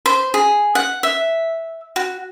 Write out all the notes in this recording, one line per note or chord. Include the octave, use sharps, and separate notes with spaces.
C5
G#4
F#5
E5
F#4